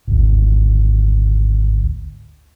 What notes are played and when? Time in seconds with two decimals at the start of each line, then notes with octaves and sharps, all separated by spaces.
0.07 G#1 D2